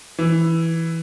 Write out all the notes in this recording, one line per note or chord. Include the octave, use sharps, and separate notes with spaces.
E3